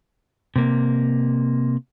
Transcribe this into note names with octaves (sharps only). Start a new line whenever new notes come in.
C3 A#3